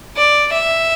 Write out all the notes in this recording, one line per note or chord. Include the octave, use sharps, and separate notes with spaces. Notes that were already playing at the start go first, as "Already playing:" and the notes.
D5
E5